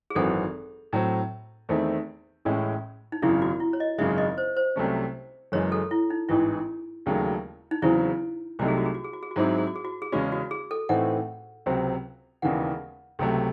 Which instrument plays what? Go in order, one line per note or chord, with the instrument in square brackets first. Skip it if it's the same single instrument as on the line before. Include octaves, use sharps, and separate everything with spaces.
[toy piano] G#4
[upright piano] G#1 F#2 E3 C4 F#4 [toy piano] A4
[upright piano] A2 F#3 C4
E2 D#3 A3 C4 E4
A1 A2 G#3 C#4 E4
[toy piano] D#4
[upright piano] G#1 F#2 C#3 [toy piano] E4
[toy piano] F#4
E4
C#5
D#5
[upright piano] G#1 F#2 C#3 G#3 [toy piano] E5
[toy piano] D#5
C5
C5
[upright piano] C2 C3 F#3 A3 C#4
[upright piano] F#1 F#2 E3 G#3 [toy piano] C#5
[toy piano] A4
E4
D#4
[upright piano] A1 G#2 E3 [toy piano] E4
[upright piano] E1 D#2 C#3 F#3 A3
[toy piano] D#4
[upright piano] E2 C#3 F#3 C4 [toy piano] E4
[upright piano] C2 C3 F#3 A3 D#4 [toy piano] F#4
[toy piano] G#4
F#4
G#4
F#4
G#4
F#4
G#4
F#4
[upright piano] G#2 F#3 C4 E4 [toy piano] G#4
[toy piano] F#4
G#4
F#4
G#4
F#4
G#4
[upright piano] E2 C#3 G#3 C#4 [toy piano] F#4
[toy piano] F#4
G#4
A4
[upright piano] A2 E3 A3 C4 D#4 [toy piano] F#5
[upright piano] C#2 C3 F#3 C4
[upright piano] E1 D#2 C#3 E3 [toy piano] F#5
[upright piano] C#2 C3 F#3 A3